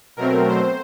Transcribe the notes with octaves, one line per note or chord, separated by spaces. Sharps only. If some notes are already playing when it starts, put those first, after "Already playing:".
B2 F#3 A3 C4 A#4
C5